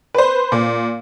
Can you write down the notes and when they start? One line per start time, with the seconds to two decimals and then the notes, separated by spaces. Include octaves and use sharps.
0.15 B4 C5
0.52 A#2